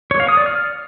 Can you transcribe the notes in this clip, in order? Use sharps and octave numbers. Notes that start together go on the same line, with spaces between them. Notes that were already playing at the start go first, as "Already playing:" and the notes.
C#5
F5
D#6
D5
F6